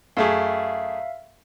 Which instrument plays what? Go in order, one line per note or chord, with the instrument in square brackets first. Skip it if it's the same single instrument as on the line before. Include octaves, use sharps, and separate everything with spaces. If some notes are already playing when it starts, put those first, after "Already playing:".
[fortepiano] F#2 A3 G#4 [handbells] E5 F5